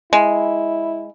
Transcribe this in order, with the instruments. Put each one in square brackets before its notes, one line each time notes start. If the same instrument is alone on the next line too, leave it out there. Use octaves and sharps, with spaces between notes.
[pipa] G#3 [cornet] E4